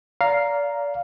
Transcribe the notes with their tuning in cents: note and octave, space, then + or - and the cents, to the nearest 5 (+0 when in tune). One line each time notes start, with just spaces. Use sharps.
D5 -30 F5 +0 A#5 +0